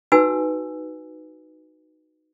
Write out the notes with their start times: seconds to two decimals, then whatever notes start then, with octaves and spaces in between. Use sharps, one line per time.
0.12 D#4 F#4 B4 G#5 E6